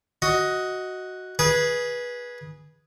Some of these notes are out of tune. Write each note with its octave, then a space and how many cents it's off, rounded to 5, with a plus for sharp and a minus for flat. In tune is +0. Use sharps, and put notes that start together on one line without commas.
F#4 +0 D#5 +10
G#4 +0 B4 -20